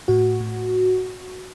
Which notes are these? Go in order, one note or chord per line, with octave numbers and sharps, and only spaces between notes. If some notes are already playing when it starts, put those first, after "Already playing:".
A2 F#4
A2